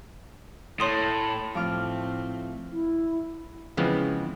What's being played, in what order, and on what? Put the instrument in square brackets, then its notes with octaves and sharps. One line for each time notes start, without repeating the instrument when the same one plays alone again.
[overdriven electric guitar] A2 [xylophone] C#5 C6 D#6
[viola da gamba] A2 A3 C4 [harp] F3 D6 F6
[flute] E4
[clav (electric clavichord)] C#3 E3 F3 G#3 B3 C4